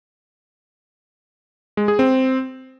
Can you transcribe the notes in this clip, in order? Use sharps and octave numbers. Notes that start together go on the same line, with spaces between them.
G#3
G#4
C4